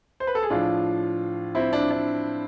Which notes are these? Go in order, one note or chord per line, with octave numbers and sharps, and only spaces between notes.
C5
B4
A4
G#4
A2 F3 D4 F4
C4 E4
D4
D4